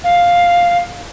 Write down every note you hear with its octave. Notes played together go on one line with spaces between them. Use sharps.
F5